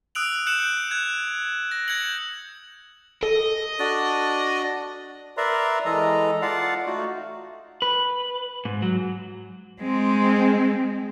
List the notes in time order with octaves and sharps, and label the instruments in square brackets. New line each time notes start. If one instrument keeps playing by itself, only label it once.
[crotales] D#6 E6 F#6 D7 F7 F#7
F#6 G6 C#7 E7 F#7
F#6 G#6
A#6
G6 G#6 C#7 F#7
[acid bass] A4 [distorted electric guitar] D#5
[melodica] D4 F#4 D5
[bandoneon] A#4 B4 D5 E5 A#5 C6
E3 G#3 A4 D#5 A#5
F4 D5 F5 F#5 A5
A3 D#4 F4 F#4
[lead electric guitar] B4
G#2
F#3
[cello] G#3 C4